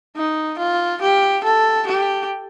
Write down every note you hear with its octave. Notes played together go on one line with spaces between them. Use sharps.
D#4
F4
G4
A4
G4